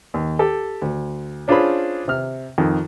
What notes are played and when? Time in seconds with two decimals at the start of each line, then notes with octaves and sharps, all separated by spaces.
0.14 D#2
0.39 G4 A4
0.82 D2
1.48 C#4 D4 F4 G#4 C5 B5
2.08 C3 F6
2.58 F2 D#3